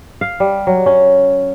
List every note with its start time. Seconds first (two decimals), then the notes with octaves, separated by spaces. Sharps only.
0.21 F5
0.40 G3
0.67 F#3
0.86 C#4